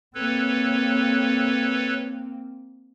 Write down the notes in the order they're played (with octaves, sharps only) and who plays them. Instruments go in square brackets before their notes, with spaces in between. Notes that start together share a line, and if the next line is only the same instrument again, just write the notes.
[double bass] A#3 C4 [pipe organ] A4 B4 C#5